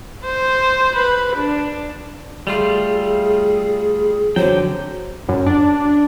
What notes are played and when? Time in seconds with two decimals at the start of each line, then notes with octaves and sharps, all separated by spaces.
0.25 C5
0.96 B4
1.36 D4
2.47 G3 A3 F4 G#4
4.36 D3 F#3 C5 G5
5.29 F#2
5.46 D4